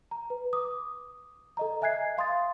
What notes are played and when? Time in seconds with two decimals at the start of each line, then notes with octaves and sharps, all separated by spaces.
0.11 A#5
0.30 B4
0.53 D6 D#6
1.57 A4 D#5 A#5
1.81 D#5 E5 G#5 F#6 G#6 C7
2.17 F5 C6 D#6 A6